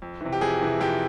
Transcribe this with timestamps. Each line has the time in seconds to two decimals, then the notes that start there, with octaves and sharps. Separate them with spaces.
0.02 F2
0.21 C3 E3
0.32 G4
0.41 F2 G#4
0.61 C3 E3
0.81 F2 G4